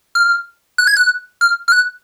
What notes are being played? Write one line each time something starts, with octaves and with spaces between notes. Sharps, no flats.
F6
F#6
G#6
F#6
F6
F6
F#6